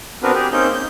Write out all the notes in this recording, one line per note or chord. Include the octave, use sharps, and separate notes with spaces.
B3 C4 D4 F#4 A#4 B4
G4 G#4
A#3 C4 C#4 D#4 G6
G6